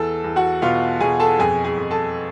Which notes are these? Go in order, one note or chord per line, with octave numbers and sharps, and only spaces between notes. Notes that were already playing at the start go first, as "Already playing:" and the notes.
Already playing: E2 A4 A5
E2
F#4 F#5
B2 F4 F5
B2 G#4 G#5
A4 A5
F2 G#4 G#5
G#4 G#5
F2
A4 A5